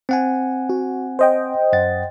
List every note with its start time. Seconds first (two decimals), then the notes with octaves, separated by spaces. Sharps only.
0.09 C4 F#5 G#5
0.69 F#4
1.19 C5 D#5 G5
1.73 F#2 F#5 A6